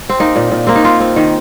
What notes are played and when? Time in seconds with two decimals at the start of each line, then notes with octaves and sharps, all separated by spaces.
0.09 C4
0.20 A#3 D#4
0.36 A#2
0.52 A#2
0.67 A#3 C4
0.75 D#4
0.84 C4 F4
1.00 C4
1.16 D#3